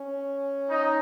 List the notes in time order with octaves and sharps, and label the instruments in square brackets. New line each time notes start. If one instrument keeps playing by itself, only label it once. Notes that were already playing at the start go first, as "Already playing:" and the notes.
Already playing: [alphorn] C#4
[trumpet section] D#4